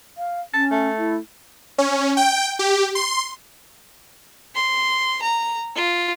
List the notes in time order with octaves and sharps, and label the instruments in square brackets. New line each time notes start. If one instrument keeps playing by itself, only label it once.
[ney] F5
[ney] C#4 [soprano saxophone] A5
[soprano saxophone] A3
[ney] E4
[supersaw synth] C#4
G5
G4
C6
[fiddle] C6
A#5
F4